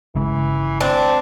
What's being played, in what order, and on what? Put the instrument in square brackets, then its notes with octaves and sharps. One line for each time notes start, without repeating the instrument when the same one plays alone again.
[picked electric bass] G1 C#3 G#3 [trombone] E3
[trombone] C4 [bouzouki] D4